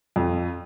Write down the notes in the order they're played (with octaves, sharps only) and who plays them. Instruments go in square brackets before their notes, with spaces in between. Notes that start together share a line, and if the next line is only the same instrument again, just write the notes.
[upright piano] F2